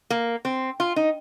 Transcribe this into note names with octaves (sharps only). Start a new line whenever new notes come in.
A#3
C4
F4
D#4